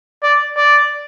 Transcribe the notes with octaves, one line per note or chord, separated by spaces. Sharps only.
D5
D5